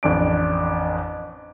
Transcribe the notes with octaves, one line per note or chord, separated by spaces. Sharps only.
A1 F2 D4 D7